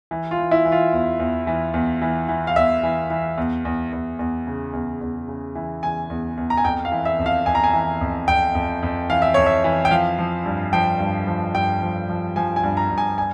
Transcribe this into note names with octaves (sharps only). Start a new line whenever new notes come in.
E3
F4
E3
E4
E3
F4
E2
E2
E3
E2
E3
E3
F5
E2 E5
E3
E3
E2
E2
E2
E2
C#3
E2
E2
C#3
E3
E3 G#5
E2
E2
A#5
G#5
F2 G5
F5
E3
E5
F2
F5
F2 G#5
A#5
G#5
E3
F2
F2 G5
F2
F2
E3 F5
E5
F2 C#5
E5
E3
G5
F3 F5
F3
G2
F3 G5
G2
F3
G2 G5
F3
F3
F3 G#5
G#5
G2
A#5
G2
G#5
G#5